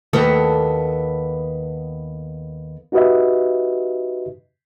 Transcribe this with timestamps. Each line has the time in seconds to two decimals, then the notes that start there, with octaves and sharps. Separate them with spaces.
0.13 D#2 B3 A4
2.92 D#4 F#4 G4 B4 D#5 E5